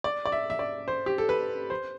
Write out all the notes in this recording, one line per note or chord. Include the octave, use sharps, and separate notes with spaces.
D5
D5
E5
E5
D5
C5
G4
A4
B4
C5